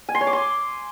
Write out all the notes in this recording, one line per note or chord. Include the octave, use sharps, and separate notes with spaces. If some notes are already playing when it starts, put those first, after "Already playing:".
G#5
C6
C#5
D6
C6